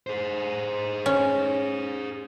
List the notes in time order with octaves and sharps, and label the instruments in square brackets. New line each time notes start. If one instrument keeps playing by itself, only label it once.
[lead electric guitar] G#4 C5
[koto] C#4